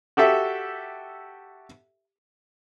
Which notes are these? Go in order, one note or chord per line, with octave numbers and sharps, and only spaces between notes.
F#4 G4 A4 E5